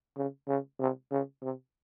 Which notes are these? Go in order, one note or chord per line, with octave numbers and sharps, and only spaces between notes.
C#3
C#3
C3
C#3
C3